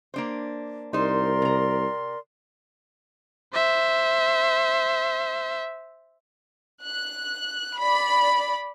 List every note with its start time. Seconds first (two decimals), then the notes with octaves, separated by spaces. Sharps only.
0.14 A#3 D4 C5
0.93 C2 D#4 A#4 C5 D5 C6
1.42 C3 A#5
3.54 C5 E5
6.84 F#6
7.78 D5 B5